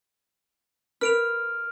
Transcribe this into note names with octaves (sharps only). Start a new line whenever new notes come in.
A#4 B4 F6 D7 F7